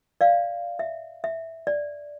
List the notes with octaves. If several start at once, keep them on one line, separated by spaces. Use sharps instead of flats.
D5 F5
E5
E5
D5